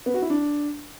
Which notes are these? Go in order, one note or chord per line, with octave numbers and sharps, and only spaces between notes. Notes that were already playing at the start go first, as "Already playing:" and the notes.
B3
F#4
E4
D4